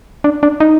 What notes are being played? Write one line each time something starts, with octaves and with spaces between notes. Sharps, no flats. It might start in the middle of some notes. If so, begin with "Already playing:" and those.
D4
D4
D#4